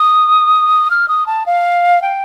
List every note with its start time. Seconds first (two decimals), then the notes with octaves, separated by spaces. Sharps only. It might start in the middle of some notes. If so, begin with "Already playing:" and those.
Already playing: D#6
0.90 F6
1.08 D#6
1.27 A5
1.46 F5
2.02 G5